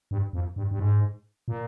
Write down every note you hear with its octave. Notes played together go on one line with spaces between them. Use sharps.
G2
F2
G2
G2
G#2
A#2